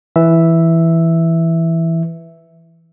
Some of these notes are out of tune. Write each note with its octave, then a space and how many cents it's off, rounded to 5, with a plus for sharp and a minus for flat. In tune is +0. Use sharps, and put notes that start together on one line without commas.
E3 +0 E5 +0